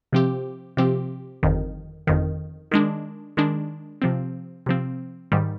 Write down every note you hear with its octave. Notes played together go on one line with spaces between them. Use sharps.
C3 F3 C4 G4
C3 F3 C4 G4
G1 F2 D#3
G1 F2 D#3
D#3 G#3 D4
D#3 G#3 D4
C3 F3 C4
C3 F3 C4
G#2 D#3 G3